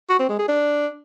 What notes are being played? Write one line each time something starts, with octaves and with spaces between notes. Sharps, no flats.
F#4
C4
G#3
G#4
D4